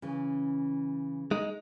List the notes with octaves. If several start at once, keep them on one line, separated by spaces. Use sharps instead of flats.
C#3 E3 C#4
G#3 D#4